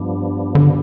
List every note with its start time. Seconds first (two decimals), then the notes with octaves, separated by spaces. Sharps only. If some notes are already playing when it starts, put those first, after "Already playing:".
Already playing: G2 F3 B3 D4
0.55 D3